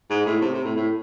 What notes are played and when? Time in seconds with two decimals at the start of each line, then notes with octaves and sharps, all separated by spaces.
0.10 G#2
0.26 A2
0.41 C3
0.53 C3
0.64 A2
0.76 A2